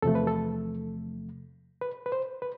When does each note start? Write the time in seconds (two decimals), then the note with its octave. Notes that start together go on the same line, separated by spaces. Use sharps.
0.02 E2 C3 F3 A3 A4
0.15 B4
0.27 A4
1.81 B4
2.06 B4
2.12 C5
2.42 B4